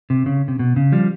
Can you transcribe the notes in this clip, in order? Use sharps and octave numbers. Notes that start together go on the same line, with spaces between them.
C3
C#3
C3
B2
C#3
F3 G3